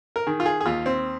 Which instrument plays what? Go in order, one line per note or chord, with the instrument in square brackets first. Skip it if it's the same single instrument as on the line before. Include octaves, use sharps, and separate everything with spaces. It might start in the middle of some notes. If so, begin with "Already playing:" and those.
[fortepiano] A#4
D#3 G#4
F4
G#4
G#4
D#2 F4
C4